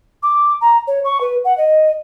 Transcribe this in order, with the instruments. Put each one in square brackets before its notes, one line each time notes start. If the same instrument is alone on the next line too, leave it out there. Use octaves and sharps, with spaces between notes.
[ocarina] D6
A#5
C#5
C#6
B4
F#5
D#5